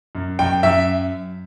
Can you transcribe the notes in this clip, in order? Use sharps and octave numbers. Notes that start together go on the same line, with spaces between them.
F#2
F#2 G5
F#2 E5